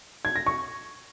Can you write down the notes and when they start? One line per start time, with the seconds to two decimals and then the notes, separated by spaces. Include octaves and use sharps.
0.25 G#6
0.36 A#6
0.47 C#6